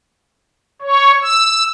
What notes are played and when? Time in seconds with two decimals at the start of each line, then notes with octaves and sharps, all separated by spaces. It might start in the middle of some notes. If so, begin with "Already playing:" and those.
0.82 C#5
1.22 E6